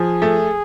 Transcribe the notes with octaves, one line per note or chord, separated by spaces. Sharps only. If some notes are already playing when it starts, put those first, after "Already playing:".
Already playing: F3 G#4
A3